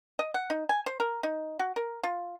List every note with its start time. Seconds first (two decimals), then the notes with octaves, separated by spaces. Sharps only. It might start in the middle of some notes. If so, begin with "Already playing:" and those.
0.19 D#5
0.34 F#5
0.50 D#4
0.69 G#5
0.86 C5
1.00 A#4
1.23 D#4
1.59 F#4
1.76 A#4
2.03 F4